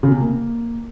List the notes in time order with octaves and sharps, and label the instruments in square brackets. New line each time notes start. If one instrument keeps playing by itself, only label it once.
[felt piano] C#3
C3
A#3